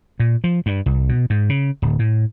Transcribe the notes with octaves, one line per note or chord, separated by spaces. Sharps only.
A#2
F3
G2
C2
B2
G#2
C#3
D1
A2